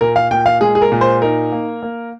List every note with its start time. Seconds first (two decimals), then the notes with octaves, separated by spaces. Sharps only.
0.01 A#2 A#4
0.16 F5
0.31 A#2 G5
0.46 F5
0.61 G#3 G#4
0.75 G#4
0.82 A#4
0.92 A#2
1.01 C5
1.22 D#4 A#4
1.52 A#3
1.83 A#3